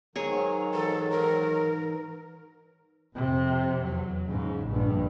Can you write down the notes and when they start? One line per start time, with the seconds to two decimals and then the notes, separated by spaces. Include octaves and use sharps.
0.16 G#2 D#3 F#3 G#4 C#5 A#5
0.74 E3 D#4 A4
1.11 A#4
3.15 F2 C3
3.84 E2 F#3
4.27 G#2 C#3
4.67 A#1 G2